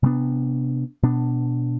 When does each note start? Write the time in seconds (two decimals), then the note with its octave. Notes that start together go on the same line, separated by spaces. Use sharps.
0.03 C3 G3 B3 D4
1.03 B2 B3 D4